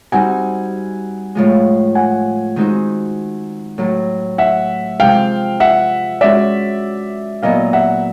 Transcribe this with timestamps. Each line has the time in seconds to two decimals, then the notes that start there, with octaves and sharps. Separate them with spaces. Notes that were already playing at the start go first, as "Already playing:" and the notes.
0.12 G3 C4 D#4 F#4 F#5 G#5
1.35 A2 F3 G#3
1.95 F#5 G#5
2.56 D#3 G#3 C4 D#4 F#4
3.78 A2 F#3 A3
4.38 E5 F#5
5.00 C3 F3 G#3 F5 G5
5.60 E5 F#5
6.21 G#3 C#4 F#4 D5 E5
7.43 A#2 F#3 B3 E4 D#5 F5
7.73 E5 F#5